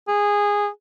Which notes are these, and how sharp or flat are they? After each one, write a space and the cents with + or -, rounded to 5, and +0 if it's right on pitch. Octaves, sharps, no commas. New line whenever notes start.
G#4 -15